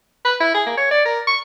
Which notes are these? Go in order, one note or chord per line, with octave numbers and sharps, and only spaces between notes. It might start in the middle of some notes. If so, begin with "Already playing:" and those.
B4
E4
G#4
A#3
C#5
D5
A#4
C#6